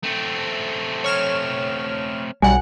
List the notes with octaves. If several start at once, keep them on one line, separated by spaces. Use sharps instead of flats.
A3 C4
C#5 F6 E7
B1 G3 F#5 G#5